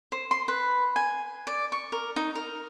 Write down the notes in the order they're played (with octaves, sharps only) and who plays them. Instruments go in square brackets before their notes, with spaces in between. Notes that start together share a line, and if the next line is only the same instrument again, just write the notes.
[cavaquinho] C5
C6
B4
G#5
D5
C#6
A#4
D#4
A#4